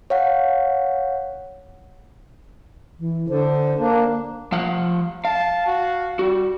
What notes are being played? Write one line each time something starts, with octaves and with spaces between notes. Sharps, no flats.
C#5 F5 F#5
E3
D3 C5
A#3 D4
F3 F5 F#5
F5 A5
F#4
G3 F#4